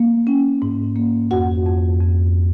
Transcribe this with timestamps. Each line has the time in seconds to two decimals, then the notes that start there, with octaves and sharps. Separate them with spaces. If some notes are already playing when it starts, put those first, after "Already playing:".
Already playing: A#3
0.27 C#4
0.62 G#2
0.96 A#3
1.31 F2 F#4 F#5
1.66 F2
2.00 F2